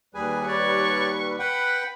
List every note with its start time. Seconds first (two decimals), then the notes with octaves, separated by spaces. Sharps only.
0.14 D#2 G3 G#4 B4 G#5
0.48 C#5 D5 C#6
1.39 B4 F#5 G5 B5